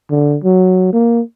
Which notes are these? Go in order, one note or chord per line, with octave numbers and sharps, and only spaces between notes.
D3
F#3
A#3